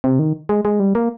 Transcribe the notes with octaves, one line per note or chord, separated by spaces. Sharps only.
C3
D#3
G#3
G#3
G3
A#3